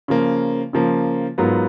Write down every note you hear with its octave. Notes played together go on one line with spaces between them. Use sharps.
C#3 F3 A#3
C#3 F3 A#3
G#2 F#3 B3 F4 A#4